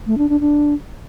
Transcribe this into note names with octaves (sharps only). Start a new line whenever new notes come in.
A3
D4
D4
D4